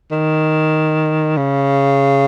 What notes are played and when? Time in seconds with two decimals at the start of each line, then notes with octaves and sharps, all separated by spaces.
0.12 D#3
1.37 C#3